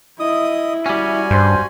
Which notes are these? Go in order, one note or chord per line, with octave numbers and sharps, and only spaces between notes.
E4 D#5 D#6
G3 C#4 F#4 G#5
G2 C5